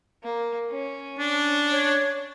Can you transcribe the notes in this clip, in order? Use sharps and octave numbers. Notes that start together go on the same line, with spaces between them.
A#3
C#4
D4
C#5